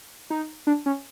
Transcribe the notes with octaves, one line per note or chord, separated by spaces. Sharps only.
D#4
D4
C#4